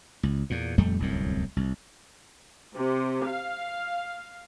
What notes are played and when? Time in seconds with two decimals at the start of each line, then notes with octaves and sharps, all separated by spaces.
0.23 C#2
0.50 E2 A#2
0.78 D#1 F2 G3 A3
0.99 D1 C2 F#2 A2
1.57 C2
2.76 C3
3.27 F5